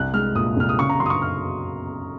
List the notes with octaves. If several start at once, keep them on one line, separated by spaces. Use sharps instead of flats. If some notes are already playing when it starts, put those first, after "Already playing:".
Already playing: C2 F#6
G#3 F6
A#2 D#6
C2 F6
D#6
C#3 C#6
A#5
F#2 C6
D#6
C#6
F6